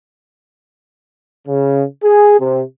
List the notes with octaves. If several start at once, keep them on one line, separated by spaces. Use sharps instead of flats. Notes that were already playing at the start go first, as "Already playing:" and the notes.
C#3
G#4
C3